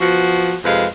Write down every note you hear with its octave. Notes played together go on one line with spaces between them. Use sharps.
F3 B3 F#4
F2 C3 G#3 B4 F5